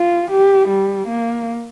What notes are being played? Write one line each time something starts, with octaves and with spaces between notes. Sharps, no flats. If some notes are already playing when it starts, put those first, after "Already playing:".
Already playing: F4
G4
G3
A#3